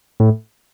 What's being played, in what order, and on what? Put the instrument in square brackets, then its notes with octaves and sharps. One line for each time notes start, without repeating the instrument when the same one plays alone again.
[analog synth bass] A2